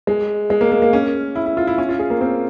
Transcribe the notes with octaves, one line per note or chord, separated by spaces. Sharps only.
G#3
G#3
A#3
A#3
A#3
C#4
E4
E4
F4
E4
C#4
F4
G#4
A#3
C4